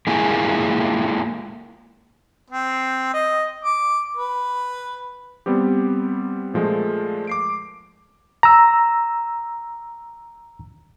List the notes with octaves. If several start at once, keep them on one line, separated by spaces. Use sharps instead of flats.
G#3 A#3 E4 F4 G#4
C4
D#5
D6
B4
G3 B3 C4 G4
A#2 F3 G#3 A3
D6 C7 D7
A#5 E6